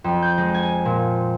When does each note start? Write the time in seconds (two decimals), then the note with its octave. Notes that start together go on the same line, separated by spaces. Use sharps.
0.04 F2
0.22 G6
0.38 G#3
0.54 G#5
0.85 A#2